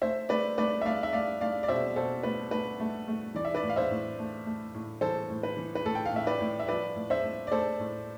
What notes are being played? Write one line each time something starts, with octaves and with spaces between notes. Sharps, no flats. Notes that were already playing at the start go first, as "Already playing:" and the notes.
A3 C5 E5
A3 B4 D5
A3 B4 D5
E5
A3 D5 F5
E5
A3 D5 F5
A3 D5 F5
D5
B2 C5 E5
B2 A4 C5
A3 B4
A3 B4
A3
A3
E3 D5
E5
B4 D5
A2
F5
C5 E5
A2
A3
A3
A2
E3 A4 C5
A2
B4
E3
B4
A2 A4
G5
F5
A2 E5
B4 D5
A2
E5
F3 B4 D5
A2
C5 E5
A2
D5
A3 A4 C5
A2